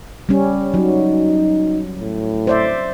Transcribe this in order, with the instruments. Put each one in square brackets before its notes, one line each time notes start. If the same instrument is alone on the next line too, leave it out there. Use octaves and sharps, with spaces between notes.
[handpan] G3 C#4
[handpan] F#3 [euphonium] D#4
[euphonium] A2
[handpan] C5 D5 E5